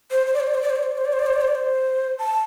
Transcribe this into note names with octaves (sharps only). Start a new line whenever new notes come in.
C5
C5
D5
C5
D5
C5
D5
C5
D5
C5
D5
C5
D5
C5
D5
C5
D5
C5
D5
C5
A5